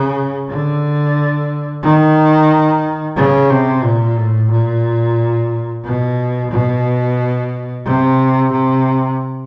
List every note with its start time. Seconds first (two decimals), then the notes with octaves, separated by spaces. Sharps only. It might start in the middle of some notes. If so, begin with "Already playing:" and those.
Already playing: C#3
0.49 D3
1.83 D#3
3.17 C#3
3.50 C3
3.83 A#2
4.16 A2
4.50 A#2
5.84 B2
6.51 B2
7.85 C3
8.51 C3